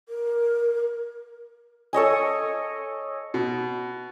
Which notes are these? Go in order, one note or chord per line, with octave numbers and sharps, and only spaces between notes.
A#4
A4 C#5 D#5 G#5
B2